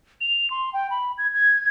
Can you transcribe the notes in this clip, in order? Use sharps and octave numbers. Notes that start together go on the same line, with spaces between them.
F7
C6
G5
B5
G#6
G#6